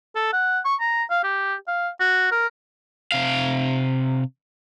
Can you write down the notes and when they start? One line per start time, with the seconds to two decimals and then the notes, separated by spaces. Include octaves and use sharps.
0.15 A4
0.33 F#5
0.65 C#6
0.81 A#5
1.10 F5
1.24 G4
1.68 F5
2.00 F#4
2.32 A#4
3.12 C3 F5